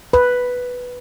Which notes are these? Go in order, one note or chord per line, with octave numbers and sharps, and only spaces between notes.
B4